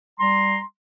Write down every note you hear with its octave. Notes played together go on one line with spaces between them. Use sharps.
G3 A#5 C6